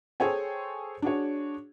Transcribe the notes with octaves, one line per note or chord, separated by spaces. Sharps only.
G#4 A4 C5 C#5 G5 G#5
D4 F#4 G#4 C#5